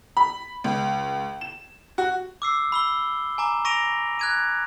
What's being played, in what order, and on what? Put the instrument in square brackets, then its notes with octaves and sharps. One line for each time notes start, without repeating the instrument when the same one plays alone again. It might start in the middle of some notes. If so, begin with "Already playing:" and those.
[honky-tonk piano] B5
C#2
E7
F#4
[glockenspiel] D6 E6 C7
B5 E6 G7
G#5 A#5 D6
C#6 A#6 D7 D#7 F7
F#6 G#6 D#7